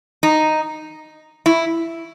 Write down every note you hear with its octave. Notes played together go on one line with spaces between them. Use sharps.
D#4
E4